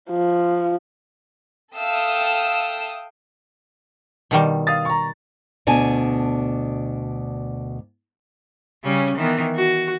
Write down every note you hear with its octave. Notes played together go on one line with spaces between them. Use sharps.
F3
A4 E5 F5 G5 D#6 E6
B2 D#3 G3
F5 D#6 A6
A#5 C#6
D2 B2 D4 G#5 A5
C#3 G3 C#4
D#3 E3 B3
F#4